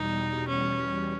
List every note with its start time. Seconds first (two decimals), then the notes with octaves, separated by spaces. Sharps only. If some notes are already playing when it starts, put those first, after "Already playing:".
Already playing: E2 B2 G3 D#4
0.48 C#4